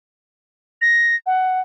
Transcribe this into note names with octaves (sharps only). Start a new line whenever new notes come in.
A#6
F#5